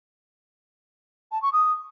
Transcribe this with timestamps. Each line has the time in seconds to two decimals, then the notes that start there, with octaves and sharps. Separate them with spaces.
1.32 A5
1.42 C#6
1.53 D#6